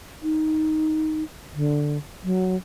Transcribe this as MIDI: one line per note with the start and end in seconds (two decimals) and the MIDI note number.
0.23 1.23 63
1.54 1.97 50
2.24 2.56 54